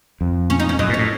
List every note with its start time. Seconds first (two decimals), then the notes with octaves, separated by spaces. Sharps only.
0.21 F2
0.50 C#4
0.60 D#4
0.69 C#4
0.79 F#2 D#4
0.89 A#2
0.94 A2 C#4